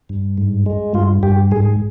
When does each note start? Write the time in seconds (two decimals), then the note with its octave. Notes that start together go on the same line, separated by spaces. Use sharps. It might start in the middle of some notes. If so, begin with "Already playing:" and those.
0.09 G2
0.38 G#2
0.66 G#3
0.94 G2 F4
1.23 G2 G4
1.51 G#2 G#4